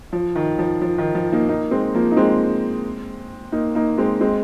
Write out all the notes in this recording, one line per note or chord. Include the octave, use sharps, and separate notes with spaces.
F3
D#3
F3
F3
D#3
F3
A#3 D#4
A#3 D#4
G#3 C4
F3 A#3
D#4
G#3 C4
A#3 D#4
A#3 D#4
G#3 C4
G#3 C4